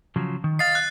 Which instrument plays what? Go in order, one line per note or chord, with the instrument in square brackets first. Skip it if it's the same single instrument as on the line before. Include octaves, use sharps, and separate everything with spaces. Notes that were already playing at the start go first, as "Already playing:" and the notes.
[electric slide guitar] C#3 F3 F#3
D#3
[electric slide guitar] D#5 F5 [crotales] A6 C7
[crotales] F#6